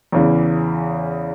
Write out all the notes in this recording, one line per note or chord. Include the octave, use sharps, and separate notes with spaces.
E2 C#3 E3